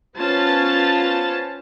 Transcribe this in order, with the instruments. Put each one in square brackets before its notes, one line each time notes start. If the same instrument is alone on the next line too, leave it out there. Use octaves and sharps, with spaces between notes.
[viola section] B3 C#4 F4 C5 A5